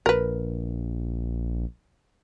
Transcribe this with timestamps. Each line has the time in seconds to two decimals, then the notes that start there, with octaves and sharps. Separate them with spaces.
0.06 A#1 A#4 B4